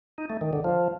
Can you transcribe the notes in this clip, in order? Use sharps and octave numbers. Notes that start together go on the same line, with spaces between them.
D#4
A3
D#3
D3
F3